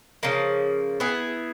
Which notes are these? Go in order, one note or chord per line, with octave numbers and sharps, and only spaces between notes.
C#3 F3 A#3
B3 E4 G#4